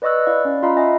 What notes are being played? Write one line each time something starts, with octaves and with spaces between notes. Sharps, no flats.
B4 D5 D#5 C#6 E6 F#6
E4 D5 F5
C#4
F4 D#5 F5 A#5 B5
D#5 E5 G#5